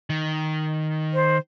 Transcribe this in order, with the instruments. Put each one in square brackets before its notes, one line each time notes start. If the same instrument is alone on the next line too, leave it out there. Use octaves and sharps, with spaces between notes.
[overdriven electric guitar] D#3
[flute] C5